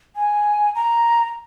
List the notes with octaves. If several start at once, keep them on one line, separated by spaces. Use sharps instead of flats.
G#5
A#5